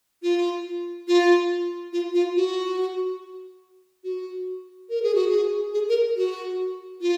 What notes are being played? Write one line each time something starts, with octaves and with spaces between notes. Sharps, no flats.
F4
F4
F4
F4
F#4
F#4
A#4
G#4
F#4
G#4
G#4
A#4
F#4
F4